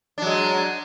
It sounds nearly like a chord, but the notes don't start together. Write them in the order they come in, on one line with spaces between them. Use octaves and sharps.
D4 F#3 G#3